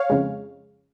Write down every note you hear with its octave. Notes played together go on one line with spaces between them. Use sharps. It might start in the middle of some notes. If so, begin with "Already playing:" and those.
Already playing: C#5 F5
F2 C#3 G#3